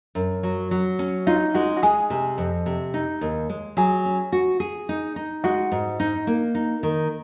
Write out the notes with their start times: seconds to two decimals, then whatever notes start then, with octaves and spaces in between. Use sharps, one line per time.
0.15 F#2
0.43 F#3
0.71 F#3
0.99 C#4
1.27 D#4 F4
1.54 G#3 F#4
1.77 F#4
1.83 G#3 G#4
2.10 C3
2.38 F2
2.66 C3
2.94 D#4
3.21 D#2
3.50 G#3
3.77 F#3 G#4
4.06 C#4
4.32 F#4
4.60 G#4
4.89 D#4
5.16 D#4
5.44 G#3 F#4
5.72 G#2
6.00 D#4
6.27 A#3
6.55 D#4
6.83 D#3